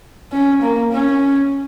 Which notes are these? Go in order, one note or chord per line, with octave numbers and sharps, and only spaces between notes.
C#4
A#3
C#4